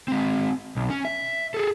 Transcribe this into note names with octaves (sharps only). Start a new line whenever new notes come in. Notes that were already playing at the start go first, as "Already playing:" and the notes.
G#3 C4
B1
C#4
E5
G#4 A4